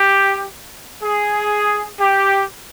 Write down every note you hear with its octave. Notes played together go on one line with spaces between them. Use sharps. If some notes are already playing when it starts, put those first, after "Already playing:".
Already playing: G4
G#4
G4